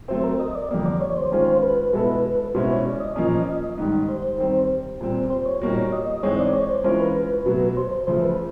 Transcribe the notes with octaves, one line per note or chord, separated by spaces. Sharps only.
F#3 A3 C4 C5
A#4
D#5
D5
F2 D3 G3 A#3
D5
C#5
C5
D#3 G#3 C#4 F4
B4
B2 G#3 B3 E4 A4
B2 G#3 C#4 E4 C5
C#5
D5
D#5
A#2 F3 A#3 C#4
G#2 D#3 G3
C5
D#3 G3 C4
A#2 G3 C4
C5
C#5
A#2 G3 A#3 D#4 F#4
D#5
G#2 E3 G#3 C4 D#4 C#5
D5
C#5
C5
E3 G#3 C#4 F4 A#4 C5
B4
B2 F#3 A3
C5
C5
C#3 F3 A3 C5
B4